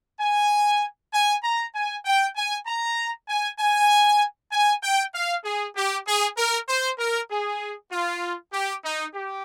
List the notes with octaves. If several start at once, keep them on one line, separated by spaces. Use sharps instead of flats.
G#5
G#5
A#5
G#5
G5
G#5
A#5
G#5
G#5
G#5
G5
F5
G#4
G4
G#4
A#4
C5
A#4
G#4
F4
G4
D#4
G4